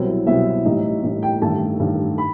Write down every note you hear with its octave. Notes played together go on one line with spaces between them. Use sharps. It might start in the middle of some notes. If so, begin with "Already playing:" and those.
Already playing: C2 B2 F#3 C4 E4
C2 B2 F#3 C4 E4 E5
A1 A2 G3 D#4
A1 A2 G3 D#4
G5
A1 G2 D#3 A3 A5
A1 G2 D#3 A3
B5